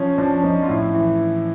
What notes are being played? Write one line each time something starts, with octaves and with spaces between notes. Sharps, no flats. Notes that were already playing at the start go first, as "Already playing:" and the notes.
Already playing: F3 C#4
F3 D4
F3 D#4
F4
A2 E4
E3